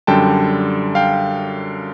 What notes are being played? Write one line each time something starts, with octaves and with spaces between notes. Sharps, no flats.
F#2 D3 G3 G5 A5
F5 G5